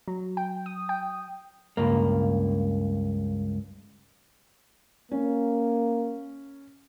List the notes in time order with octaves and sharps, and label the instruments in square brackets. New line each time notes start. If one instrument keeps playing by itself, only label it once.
[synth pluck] F#3
G5
D#6
G5
[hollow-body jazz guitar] C#2 G2 A#3
[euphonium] A#3 [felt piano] C#4